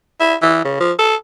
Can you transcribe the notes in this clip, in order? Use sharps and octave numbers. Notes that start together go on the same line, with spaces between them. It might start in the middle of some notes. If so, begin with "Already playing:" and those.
E4
E3
C#3
F3
A4